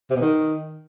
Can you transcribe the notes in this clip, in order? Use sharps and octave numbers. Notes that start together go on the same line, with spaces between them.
C3
B2
D#3